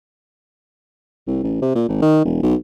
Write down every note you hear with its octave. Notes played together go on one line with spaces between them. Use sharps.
C2
A1
C3
A#2
G#1
D#3
E1
B1